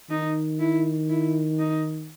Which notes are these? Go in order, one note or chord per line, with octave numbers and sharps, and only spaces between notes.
D#3 D#4
E4
E4
D#4